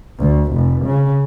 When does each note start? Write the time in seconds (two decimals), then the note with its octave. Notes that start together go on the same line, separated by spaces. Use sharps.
0.18 D2
0.53 F1
0.85 C#3